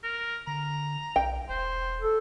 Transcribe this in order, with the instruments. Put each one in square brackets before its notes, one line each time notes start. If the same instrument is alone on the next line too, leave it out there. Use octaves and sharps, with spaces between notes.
[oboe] A#4
[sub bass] D3 [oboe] A#5
[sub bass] B1 [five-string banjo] G5
[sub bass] E1 [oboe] C5
[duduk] A4